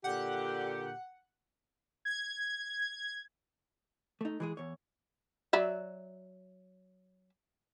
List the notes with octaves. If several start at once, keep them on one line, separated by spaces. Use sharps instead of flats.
A#2 D3 G4 F#5
G#6
A3 D#4
E3 G#3 G#4
E2 C#5
F#3 D5 E5